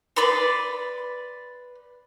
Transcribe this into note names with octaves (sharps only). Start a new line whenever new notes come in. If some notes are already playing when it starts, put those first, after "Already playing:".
B4 D5 B5 C6